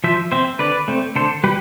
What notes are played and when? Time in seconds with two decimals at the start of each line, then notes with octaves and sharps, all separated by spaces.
0.04 F3 C5 E5
0.32 C4 C5 E5
0.59 D3 B4 D5
0.88 A3 C4
1.16 D3 A4 C5
1.44 G3 G4 B4